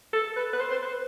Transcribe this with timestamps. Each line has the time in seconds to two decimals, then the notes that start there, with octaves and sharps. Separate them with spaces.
0.13 A4
0.36 B4
0.53 B4
0.60 C5
0.71 C5
0.82 B4